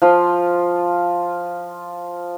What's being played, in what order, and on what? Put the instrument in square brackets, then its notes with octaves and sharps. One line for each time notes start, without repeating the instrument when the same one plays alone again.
[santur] F3 F4 C6